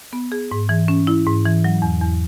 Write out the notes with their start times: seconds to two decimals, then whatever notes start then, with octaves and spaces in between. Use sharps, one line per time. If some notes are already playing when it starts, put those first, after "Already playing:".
0.13 B3
0.32 G#4
0.52 G#2
0.69 E3
0.88 C#4
1.07 E4
1.27 G#2
1.46 E3
1.64 F#3
1.82 E2
2.01 E2